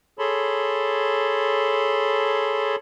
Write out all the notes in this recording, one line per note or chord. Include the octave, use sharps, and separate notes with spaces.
G#4 A4 C#5 A5 B5 C6